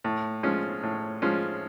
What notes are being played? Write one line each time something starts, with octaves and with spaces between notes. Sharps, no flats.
A2
F3 G#3 C#4
A2
F3 G#3 C#4